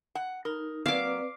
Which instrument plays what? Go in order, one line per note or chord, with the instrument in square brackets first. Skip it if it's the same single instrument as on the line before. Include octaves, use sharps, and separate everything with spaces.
[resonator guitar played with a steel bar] F#5
[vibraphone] D#4 [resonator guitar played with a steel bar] A#4
[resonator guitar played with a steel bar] F#3 A#3 [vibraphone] C4 B4 D5 [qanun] F5 D6